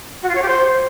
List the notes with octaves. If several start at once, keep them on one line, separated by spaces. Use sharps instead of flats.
F#4
F4
C#5
G4
C5